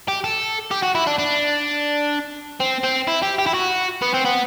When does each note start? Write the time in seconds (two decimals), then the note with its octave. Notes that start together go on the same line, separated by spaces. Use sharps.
0.08 G4
0.24 A4
0.71 G4
0.83 F#4
0.95 E4
1.07 D4
1.19 D4
2.60 C4
2.84 C4
3.08 E4
3.23 G4
3.39 G4
3.47 E4
3.54 F#4
4.02 B3
4.14 C4
4.25 B3